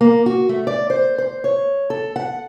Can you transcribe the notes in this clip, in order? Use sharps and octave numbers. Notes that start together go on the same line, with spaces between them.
A#3
F#4
A3
D5
C5
C5
C#5
A4
F#5